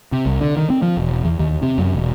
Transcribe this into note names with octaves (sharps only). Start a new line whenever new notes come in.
C3
C2
D3
D#3
C4
F3
E1
E2
D#2
C3
F#2
E1